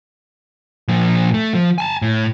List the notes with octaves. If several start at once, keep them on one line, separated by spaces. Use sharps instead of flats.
A#2 F3
A3
F3
G#5 A5
A2